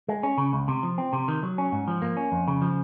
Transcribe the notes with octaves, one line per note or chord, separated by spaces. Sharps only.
G#3
C#4
C#3
C#2
C3
F3
C4
C3
D#3
F#3
C#4
G#2
F3
A#3
C#4
F2
C#3
F3